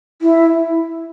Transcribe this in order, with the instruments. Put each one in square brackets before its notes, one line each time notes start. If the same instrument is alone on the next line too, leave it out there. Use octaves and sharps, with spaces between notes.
[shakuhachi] E4